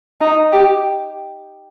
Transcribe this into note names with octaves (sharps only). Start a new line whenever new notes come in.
D#4
G4